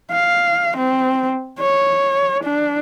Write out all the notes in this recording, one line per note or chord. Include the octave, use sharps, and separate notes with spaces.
F5
C4
C#5
D4